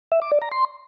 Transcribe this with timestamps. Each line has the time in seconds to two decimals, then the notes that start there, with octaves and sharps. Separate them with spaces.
0.12 E5
0.22 D6
0.32 D5
0.42 A#5
0.52 C6